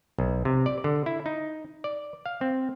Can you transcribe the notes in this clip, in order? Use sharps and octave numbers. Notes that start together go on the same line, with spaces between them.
B1
C3
D5
D3
E4
D#4
D5
F5
C4